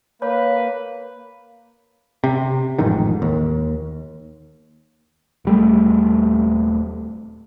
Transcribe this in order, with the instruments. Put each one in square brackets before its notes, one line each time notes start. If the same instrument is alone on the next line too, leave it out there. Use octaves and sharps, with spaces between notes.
[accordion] A#3 [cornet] B4 [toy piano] C#5 B5
[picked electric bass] C3
A1 F2 G#2 D#3
D#2
D#1 G3 A3